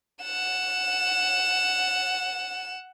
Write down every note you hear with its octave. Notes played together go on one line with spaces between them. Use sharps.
F#5 E7